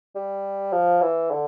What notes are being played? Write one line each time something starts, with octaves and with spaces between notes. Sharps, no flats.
G3
F3
E3
D3